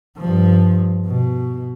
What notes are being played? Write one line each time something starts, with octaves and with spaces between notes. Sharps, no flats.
G2 F3
B2